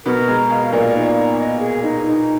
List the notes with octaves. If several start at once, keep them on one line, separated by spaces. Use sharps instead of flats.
B2 B3 A#4
G#3 A#5
G#3 F5
A#2 A#3 D5
D#4
A#5
D#5
G#4
D#4
D#4